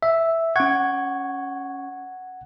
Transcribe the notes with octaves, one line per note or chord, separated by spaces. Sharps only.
E5
C#4 F#5 C#6 G#6